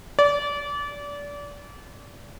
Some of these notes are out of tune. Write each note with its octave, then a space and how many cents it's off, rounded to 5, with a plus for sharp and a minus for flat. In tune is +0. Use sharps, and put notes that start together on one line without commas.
D5 -30